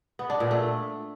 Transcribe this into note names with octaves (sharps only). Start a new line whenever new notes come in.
B3
D4
A#2
A3